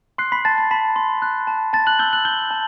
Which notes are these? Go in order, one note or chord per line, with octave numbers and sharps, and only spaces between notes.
C6 F#6 C7
B5 B6
A5 A6
A6
A5 B5 B6
C6
F#6
A5
A5 A6
F#6 F#7
E6 G6 G7
F#6 F#7
G6 G7
A5